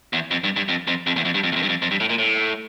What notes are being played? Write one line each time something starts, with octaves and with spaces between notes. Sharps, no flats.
E2
F2
G2
G2
F2
F2
F2
E2
F2
G2
F2
E2
F2
G2
F2
F2
G2
A2
A#2
A2